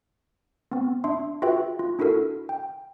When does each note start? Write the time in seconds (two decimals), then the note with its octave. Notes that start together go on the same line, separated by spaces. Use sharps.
0.71 B3 C4
1.04 D4 E5 C6
1.42 F4 F#4 G#4 B4 E5 G5
1.79 F4
1.99 D4 E4 F#4 A4 A#4
2.49 G5